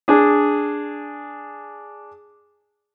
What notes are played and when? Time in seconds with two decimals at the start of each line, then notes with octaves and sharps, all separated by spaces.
0.08 D4 G#4